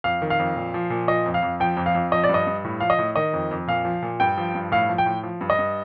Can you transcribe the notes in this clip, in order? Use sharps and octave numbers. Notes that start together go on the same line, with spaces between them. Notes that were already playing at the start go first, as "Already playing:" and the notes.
F2 F5
D#3
F5
F2
A#2
F3
A#2
F3 D#5
F2
F5
F2
F3 G5
F2
F5
F2
F3 D#5
D5
G2
D#5
G2
A2
F3 F5
D#5
A2
D#3 D#5
F2
F2
A#2 F5
F3
A#2
G2 G5
F3
G2
A2 F5
F3
G5
A2
F3
G2
D#5
G2